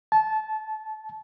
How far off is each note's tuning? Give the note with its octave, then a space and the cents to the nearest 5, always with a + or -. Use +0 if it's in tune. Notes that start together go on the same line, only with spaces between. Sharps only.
A5 -20